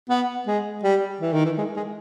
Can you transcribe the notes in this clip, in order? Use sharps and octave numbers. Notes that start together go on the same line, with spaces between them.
B3
G#3
G3
E3
D#3
E3
G#3
G#3